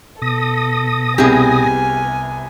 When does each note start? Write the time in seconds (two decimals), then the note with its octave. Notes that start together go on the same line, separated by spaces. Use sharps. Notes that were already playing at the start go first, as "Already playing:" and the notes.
0.22 B2 A4 D#6 A#6
1.18 C2 C3 B3 G4 G#4 G#5